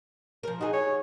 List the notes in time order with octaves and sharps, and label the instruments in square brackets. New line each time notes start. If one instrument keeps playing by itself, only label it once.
[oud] F3 A#4
[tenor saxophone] D#4 [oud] F#4 G#4
[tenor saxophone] C#5